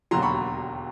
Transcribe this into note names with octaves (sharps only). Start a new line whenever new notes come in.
E1 D#2 D3 F#3 A#5 C6
B5 C#6